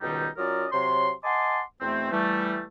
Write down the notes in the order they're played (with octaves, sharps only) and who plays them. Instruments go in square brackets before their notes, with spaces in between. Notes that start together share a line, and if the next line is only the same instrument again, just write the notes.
[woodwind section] C#2 B2 D#3 G3 D#4 G5
F#3 C#4 F4 A#4 D5 D#5
C3 F#3 C#5 C6
D#5 F#5 G#5 A5 C6 D6
E2 B2 A3 C4
E3 G3 A3